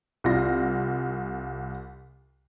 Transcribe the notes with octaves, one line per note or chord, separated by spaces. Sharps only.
C2 F4 A#6